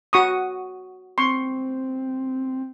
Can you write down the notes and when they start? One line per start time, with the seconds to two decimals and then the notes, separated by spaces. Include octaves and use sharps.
0.13 F#4 C#6 D#6
1.18 C4 C6 C#6